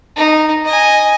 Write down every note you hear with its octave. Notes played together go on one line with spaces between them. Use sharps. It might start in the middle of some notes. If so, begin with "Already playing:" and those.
D#4
D#5 G#5